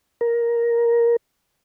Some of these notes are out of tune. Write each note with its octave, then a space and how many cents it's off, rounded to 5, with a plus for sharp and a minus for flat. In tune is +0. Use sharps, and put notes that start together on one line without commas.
A#4 +10